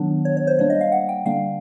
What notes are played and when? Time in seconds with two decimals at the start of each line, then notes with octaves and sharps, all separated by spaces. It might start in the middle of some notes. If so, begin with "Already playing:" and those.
Already playing: D#3 F#3 B3 D4
0.25 C#5
0.37 C#5
0.47 C5
0.59 G3 A#3 D4 C#5
0.70 D#5
0.81 F5
0.92 F#5
1.09 G5
1.26 D3 G3 A#3 D4 F5